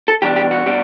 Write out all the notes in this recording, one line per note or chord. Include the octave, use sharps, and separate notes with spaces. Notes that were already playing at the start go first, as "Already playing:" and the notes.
A4
E2 B2 G3 D4 G4
G4
F#4
B2 G3 D4